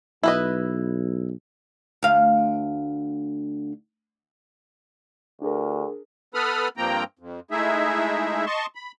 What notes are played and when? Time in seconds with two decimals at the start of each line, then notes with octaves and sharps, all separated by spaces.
0.23 B1 E4 B4 D#5
2.03 D2 F5
5.42 D2 D4 G#4 A#4
6.34 B3 A4 B4 B5 D#6 F6
6.77 G2 F3 A#3 C4 G5 A#5
7.19 F2
7.51 G#3 A3 D#4 E4 G#4 E5
8.46 D#5 A5 C6 C#6
8.75 B5